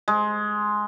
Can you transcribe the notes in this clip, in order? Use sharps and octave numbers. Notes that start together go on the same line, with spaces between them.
G#3